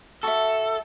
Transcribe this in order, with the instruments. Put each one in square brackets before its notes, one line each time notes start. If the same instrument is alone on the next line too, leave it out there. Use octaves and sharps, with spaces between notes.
[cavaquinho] F#4 E5 [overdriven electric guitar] A4